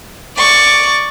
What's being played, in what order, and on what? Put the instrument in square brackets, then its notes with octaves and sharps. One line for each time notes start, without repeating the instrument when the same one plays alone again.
[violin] D5 C#6